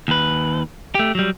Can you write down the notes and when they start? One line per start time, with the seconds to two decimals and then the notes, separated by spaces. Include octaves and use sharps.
0.08 D#2 B4
0.95 A3 G4
1.15 F#3 G3